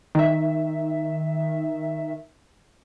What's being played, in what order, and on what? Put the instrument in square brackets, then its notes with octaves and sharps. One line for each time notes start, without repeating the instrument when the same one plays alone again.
[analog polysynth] D#3 E5